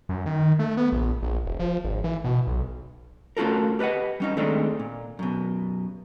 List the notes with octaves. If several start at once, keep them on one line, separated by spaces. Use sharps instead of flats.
F#2
D#3
A3
B3
A#1
A#1
E1
F3
G#1
E3
B2
B1
A3 C#4 F4 F#4 A4 A#4
G4 B4 D5 D#5 F#5
G3 C#4 D#4
D#3 G#3 A3 C4 D4 D#4
A#2
F#2 B2